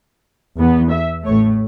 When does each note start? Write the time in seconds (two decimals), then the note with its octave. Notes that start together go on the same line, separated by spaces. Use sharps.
0.56 E2 E3 B3
0.91 E5
1.25 A1 A2 A3 C#5